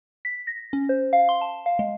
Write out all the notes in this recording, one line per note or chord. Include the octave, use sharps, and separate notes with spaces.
B6
A#6
C#4
C5
F5
C6
A5
F5
G#3